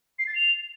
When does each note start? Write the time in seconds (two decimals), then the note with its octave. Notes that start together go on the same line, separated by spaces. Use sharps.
0.19 C7
0.27 A6
0.35 F7